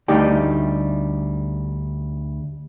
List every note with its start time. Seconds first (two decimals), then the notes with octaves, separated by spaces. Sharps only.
0.08 D2 G3 A3 D#4 G4 G5